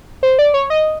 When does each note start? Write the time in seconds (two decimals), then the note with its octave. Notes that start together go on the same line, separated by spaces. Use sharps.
0.23 C5
0.39 D5
0.54 C#5
0.70 D#5